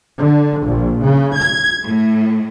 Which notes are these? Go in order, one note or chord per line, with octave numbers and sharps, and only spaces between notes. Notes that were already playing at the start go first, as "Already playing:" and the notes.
D3
A#1
C#3
G#6
A2